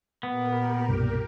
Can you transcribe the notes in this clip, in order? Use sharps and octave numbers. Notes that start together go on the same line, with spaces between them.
A#2 B3 G4 A#4
C2 G2 B2